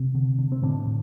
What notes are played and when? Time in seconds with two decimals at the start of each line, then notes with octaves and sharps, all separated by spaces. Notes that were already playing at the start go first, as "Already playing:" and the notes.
Already playing: C3 C4
0.15 D3
0.38 D3
0.52 C4
0.62 A2 D3 D4
0.87 A2